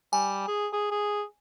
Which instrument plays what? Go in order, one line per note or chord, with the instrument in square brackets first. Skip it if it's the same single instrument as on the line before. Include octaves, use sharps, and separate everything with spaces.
[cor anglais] G3 [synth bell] G#5
[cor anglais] G#4
G#4
G#4